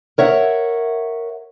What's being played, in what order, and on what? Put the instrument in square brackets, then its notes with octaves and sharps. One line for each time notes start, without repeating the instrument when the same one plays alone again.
[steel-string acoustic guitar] A#4 C#5 E5 F#5